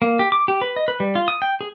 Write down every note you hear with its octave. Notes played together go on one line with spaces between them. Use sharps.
A#3
G4
D6
G4
B4
D#5
B4
G3
F4
D#6
G5
G#4